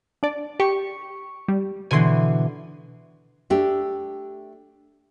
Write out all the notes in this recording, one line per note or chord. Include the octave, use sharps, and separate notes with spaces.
D4 D5
G4 C#6
G3
B2 D3 E3 G#5 C6
A3 D4 G4